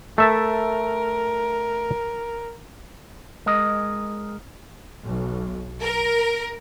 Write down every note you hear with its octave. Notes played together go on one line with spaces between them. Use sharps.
A3 A#4 E5 A5
G#3 A#4 D#5
B1
A#4